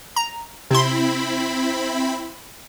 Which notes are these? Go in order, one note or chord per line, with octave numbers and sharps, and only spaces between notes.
A#5
C3 C4 E4 B5 C6